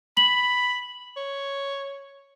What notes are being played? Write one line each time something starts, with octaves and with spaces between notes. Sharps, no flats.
B5 F#7
C#5